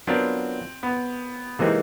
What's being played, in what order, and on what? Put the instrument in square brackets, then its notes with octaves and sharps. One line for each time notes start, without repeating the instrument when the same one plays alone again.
[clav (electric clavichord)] F#3 B3 D4 F4 A#4 [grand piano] C4
[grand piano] B3
[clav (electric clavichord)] C3 E3 G#3 C4 D#4 [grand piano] A#3